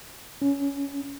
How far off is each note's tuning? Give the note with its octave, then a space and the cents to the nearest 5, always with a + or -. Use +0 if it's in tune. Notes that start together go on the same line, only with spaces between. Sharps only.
C#4 +15